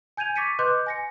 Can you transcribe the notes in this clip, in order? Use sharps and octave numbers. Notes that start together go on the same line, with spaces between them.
G#5 G6 G#6 D#7 F7
C#6 D6 A6 B6 C#7 D#7
B4 D#5 C6 D6 F#6 G6
G#5 A#6 C#7